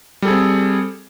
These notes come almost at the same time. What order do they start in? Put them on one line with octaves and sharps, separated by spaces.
G3 A4 G#4 C4